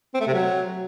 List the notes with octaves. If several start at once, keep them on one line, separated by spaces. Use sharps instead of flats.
C4
A3
C3
F#3